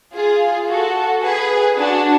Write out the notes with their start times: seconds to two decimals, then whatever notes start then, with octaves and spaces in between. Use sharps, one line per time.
0.14 F4 G#4
0.69 F#4 A4
1.23 G#4 B4
1.77 D4 F#4